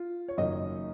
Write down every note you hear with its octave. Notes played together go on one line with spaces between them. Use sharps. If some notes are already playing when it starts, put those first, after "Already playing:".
Already playing: F4
C#5
F#1 F#2 D#3 D#4 D#5